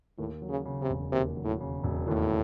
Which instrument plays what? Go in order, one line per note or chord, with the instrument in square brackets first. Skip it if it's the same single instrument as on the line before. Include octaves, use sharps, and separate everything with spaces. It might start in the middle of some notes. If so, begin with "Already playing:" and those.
[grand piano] D#2 [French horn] A2
[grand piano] F#3
[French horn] C#3
[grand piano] C#3
[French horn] C3
[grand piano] E1
[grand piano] D#2 [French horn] C3
[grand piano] F#3
[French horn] A2
[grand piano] C#3
E1
[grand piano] D#2 [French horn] A2